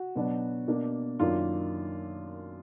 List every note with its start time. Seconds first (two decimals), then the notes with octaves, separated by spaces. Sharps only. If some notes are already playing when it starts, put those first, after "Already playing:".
Already playing: F#4
0.16 B2 F#3 B3 D4
0.68 B2 A#3 D4
1.20 F#2 D#3 A#3 D4 F4